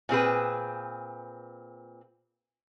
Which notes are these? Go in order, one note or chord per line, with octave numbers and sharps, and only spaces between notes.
A#2 C4 G#4 B4